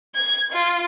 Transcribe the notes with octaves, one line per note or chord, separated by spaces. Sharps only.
G#6
F4